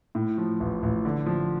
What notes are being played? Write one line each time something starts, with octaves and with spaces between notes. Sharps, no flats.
A2
F3
A1
A1
D3
F3